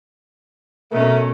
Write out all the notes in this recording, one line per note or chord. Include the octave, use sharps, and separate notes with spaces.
B2 A3 C#4 A#4